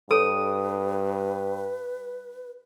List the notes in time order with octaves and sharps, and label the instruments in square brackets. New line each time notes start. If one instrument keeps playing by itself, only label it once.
[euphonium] G2 [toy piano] A4 C#5 [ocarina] B4 [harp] D#6